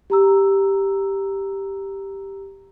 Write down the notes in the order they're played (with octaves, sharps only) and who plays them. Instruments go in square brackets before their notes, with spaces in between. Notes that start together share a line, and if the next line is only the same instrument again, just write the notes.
[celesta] G4 A#5 E6